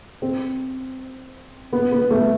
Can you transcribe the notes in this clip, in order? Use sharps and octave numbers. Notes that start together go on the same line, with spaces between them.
C4
B3
B3
A3